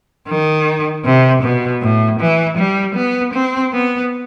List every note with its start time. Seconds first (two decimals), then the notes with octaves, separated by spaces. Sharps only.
0.28 D#3
1.05 C3
1.43 B2
1.81 A2
2.20 E3
2.57 G3
2.95 B3
3.34 C4
3.72 B3